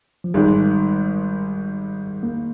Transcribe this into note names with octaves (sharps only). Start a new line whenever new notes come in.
F3
G#1 G#2 D#3 G3 G#3
A#3